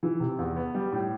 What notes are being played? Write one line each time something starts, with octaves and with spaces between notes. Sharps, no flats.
E3
C3
E2
B3
G3
A2